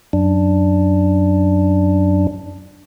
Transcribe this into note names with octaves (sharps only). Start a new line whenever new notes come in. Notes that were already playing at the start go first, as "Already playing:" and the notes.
F#2 D4